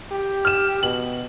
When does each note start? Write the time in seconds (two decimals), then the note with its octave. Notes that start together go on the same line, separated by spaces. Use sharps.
0.12 G4
0.45 F6 E7
0.83 B2 F#7